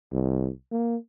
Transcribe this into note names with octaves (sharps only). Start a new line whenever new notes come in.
C2
A#3